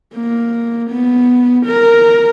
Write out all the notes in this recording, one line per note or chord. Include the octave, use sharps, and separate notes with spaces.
A#3
B3
A#4